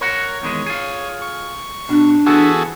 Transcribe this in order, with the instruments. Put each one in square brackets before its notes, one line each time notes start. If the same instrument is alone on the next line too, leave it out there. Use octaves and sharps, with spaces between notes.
[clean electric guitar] A#4 F#5 [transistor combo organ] C#5
[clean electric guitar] E2 D#3 G#3
F4 G#4
[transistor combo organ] C#6
[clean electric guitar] B2 [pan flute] D4
[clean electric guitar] E3 B3 E5 [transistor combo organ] F#4 G#4 A4